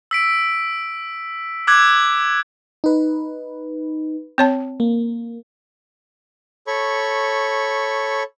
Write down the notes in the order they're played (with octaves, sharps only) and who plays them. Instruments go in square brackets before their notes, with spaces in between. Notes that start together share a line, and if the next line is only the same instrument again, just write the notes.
[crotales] E6 B6 D7
D6 E6 F#6 G#6
[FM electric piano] D#4 B4
[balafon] C4 C#5 A5
[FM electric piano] A#3
[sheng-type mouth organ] A4 C#5 B5 C#6